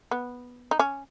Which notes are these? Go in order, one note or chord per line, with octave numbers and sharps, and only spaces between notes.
B3
D#4
C#4